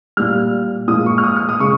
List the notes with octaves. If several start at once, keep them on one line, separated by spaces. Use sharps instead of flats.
A#2 G3 F6
A#2 F3 G#3 D#6
C#6
F6
D#6
F6
D#6
C#3 G#3 C#6